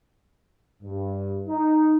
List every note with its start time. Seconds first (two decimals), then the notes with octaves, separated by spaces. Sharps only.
0.82 G2
1.47 D#4